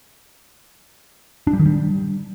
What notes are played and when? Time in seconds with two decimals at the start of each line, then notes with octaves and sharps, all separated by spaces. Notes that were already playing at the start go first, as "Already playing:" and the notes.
1.47 D4
1.53 G3
1.59 D#3
1.66 G3